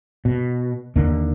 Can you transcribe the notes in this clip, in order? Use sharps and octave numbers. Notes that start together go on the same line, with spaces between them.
B2
D#2 D3 A#3